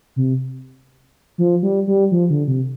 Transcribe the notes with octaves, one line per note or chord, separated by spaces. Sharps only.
C3
F3
G3
G3
F3
D3
C3